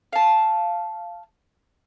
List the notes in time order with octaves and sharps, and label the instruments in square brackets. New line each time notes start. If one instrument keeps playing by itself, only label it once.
[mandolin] F5 A5